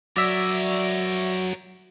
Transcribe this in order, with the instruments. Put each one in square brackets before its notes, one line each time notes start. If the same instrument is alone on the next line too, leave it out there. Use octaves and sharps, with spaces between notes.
[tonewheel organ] F#3 [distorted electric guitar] A#4 C#5 [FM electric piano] D5 E5